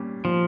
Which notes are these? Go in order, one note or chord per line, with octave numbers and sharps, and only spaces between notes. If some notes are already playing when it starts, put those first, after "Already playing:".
Already playing: A#2 G3 C#4 G4
A#2 F3